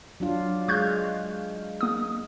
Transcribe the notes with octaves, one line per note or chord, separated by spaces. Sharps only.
F#3 D4 F4
G#3 F5 C#6 F#6 G6
A#3 D#6